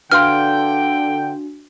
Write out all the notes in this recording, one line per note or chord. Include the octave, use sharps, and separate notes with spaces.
D3 D4 F#4 B4 F5 G5 C6 F6